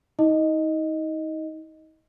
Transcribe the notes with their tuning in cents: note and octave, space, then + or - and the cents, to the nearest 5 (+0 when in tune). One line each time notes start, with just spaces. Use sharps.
D#4 +35 D#5 +0